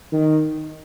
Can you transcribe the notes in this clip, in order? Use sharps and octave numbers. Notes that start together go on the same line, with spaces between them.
D#3